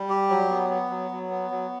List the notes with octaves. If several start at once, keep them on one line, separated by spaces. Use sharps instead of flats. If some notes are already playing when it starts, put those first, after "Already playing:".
Already playing: G3
G4
F#3
B3
B3
F#3
F#3
B3
F#3